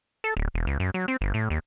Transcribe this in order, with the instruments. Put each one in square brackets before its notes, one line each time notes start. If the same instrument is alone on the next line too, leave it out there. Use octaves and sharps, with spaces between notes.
[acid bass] A4
D1
E1
C#2
F#2
F#3
C4
G1
A2
D#2